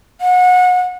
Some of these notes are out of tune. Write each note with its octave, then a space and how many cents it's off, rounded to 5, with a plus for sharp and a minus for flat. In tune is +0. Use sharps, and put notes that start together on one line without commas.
F#5 -30